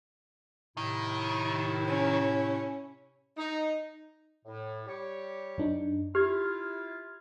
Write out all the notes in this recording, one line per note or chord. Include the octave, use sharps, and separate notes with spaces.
A2 C3 D#3 E4
C#4
D#4
A2
G3 G4 C#5
F#2 D4 D#4
E4 F4 G4 F6 G#6